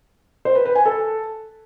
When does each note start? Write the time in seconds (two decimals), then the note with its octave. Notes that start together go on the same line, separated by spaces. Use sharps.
0.45 C5
0.55 B4
0.65 B4
0.75 G#5
0.86 A4